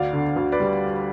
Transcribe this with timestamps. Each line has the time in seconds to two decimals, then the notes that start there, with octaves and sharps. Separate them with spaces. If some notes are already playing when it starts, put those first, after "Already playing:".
Already playing: D2 D5 F5
0.13 D3
0.36 D2
0.52 B4 D5
0.60 G3